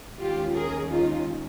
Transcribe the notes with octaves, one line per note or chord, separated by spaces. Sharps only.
D#2 D#3 G#3 C#4 F4 G4
G#4 A#4
D#4 F4